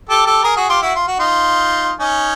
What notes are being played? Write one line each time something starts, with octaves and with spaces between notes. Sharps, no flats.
G4 A4
G4 A4
G#4 A#4
F#4 G#4
F4 G4
E4 F#4
F4
F#4
D#4 F4
C#4 D#4